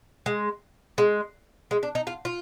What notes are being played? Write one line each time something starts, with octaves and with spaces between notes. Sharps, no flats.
G#3
G#3
G#3
D4
D#4
F4
F4